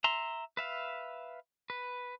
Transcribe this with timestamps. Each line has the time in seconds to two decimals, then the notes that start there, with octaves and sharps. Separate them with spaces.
0.04 E5 A#5 C6
0.57 B4 E5 F5
1.70 B4